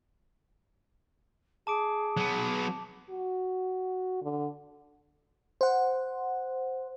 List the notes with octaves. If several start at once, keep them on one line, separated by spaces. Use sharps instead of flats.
G#4 A5 D6 D7
F#3 B3
F#4
D3
C5 F#5